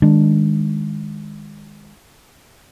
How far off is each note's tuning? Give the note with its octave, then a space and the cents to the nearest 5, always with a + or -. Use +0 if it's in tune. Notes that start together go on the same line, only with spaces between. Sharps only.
D#3 +0 G#3 -10 D4 +0